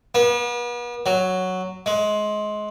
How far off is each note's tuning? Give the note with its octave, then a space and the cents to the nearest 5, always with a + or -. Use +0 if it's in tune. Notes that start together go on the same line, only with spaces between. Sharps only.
B3 -40
F#3 +0
G#3 +25